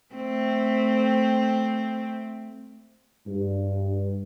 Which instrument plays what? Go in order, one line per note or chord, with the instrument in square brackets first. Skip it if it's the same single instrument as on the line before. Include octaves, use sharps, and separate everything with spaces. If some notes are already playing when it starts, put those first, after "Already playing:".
[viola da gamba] A3 C4
[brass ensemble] G2